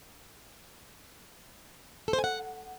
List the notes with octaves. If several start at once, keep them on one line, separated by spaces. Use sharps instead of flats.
A4
C5
G#5
F#5